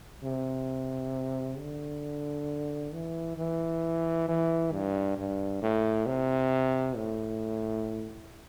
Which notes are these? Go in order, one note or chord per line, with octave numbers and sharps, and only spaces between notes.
C3
D3
E3
E3
E3
G2
G2
A2
C3
A2